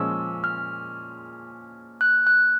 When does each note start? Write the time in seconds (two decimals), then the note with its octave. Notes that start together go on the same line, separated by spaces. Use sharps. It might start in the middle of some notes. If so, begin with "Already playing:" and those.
Already playing: A#2 F3 G#3 C#4 E6
0.44 F6
2.01 F#6
2.27 F#6